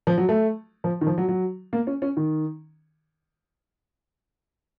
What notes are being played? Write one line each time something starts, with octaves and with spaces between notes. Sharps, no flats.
F3
F#3
A3
F3
D#3
F3
F#3
F#3
A#3
C#4
C#4
D#3